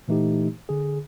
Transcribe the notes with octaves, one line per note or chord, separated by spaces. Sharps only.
A#2 E3 A3 D#4 G4
D3 G#4